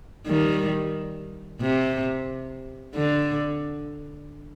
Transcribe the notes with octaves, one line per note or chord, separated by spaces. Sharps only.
D#3 G3
C3
D3